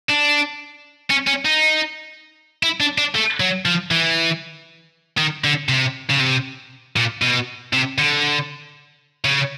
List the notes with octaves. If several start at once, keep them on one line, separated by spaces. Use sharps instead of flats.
D4
C#4
C#4
D#4
E4
D4
D4
A3
F#3
F3
E3
D#3
D3
C3
C#3
C3
A#2
B2
C3
D3
C#3